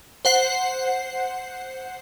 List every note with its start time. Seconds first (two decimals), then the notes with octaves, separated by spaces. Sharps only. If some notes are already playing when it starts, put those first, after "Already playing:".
0.25 C5 F#5 C7